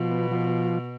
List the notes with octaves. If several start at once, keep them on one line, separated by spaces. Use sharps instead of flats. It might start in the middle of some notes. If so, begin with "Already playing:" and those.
Already playing: B2 F3
B3
F3